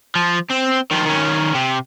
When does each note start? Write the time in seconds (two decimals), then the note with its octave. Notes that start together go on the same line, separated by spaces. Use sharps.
0.15 F3
0.50 C4
0.91 D#3 F3
1.06 D#3 C#4
1.55 C3